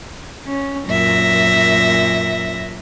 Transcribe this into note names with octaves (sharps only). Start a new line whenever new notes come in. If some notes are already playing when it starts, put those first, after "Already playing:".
C#4
F#2 A#2 E5 A#6